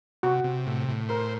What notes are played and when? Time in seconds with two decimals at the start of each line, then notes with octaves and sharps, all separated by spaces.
0.23 C3 F#4
0.44 C3
0.67 A2
0.88 A2
1.09 A#4 C5